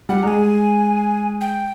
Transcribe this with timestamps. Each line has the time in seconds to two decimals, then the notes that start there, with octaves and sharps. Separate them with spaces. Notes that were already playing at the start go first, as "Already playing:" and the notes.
0.09 G3 F#5
0.23 G#3 G#5 A#5
1.41 G5